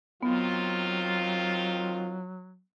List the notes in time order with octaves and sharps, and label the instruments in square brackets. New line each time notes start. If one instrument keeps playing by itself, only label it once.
[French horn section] D#3 C4 F4 [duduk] F#3 [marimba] B3